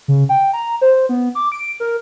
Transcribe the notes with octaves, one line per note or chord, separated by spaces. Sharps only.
C#3
G5
A#5
C5
B3
D6
D7
A#4